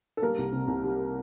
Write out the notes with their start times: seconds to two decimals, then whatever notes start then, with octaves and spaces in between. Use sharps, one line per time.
0.17 A4
0.22 G3 A#3 A#4
0.38 C2
0.53 C3
0.68 C2
0.84 G3